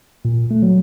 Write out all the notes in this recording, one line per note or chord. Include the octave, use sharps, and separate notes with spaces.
A#2
A3
F#3